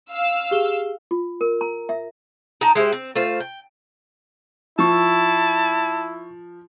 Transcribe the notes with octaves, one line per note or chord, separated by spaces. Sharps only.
F5 E6
G4 G#4 G7
F4
A#4
A#5
E5
D#4 G5 A5 A#5
G#3 E4 G4 C5
C4
A3 F4 C5
G5
F3 E4 A5 C#6 E6